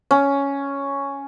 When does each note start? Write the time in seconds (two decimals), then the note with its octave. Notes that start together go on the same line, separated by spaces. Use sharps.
0.11 C#4